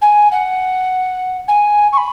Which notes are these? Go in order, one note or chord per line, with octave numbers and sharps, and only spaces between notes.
G#5
F#5
G#5
C#6
B5